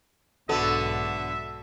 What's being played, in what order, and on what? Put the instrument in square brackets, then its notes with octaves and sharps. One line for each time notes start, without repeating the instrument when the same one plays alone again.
[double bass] B1 G#2 [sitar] D3 B3 [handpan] F#4 A4 [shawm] E5